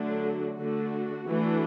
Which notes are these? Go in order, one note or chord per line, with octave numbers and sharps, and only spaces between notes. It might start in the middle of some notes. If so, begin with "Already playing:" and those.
Already playing: D3 F#3 A3 D4
F#4
D3 A3 D4 F#4
E3 A3 D4